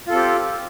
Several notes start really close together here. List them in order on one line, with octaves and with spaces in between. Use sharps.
F4 A4 C4 G4